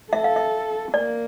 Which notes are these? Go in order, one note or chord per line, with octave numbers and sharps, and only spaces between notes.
A4 E5
F5
E5
A#3 D5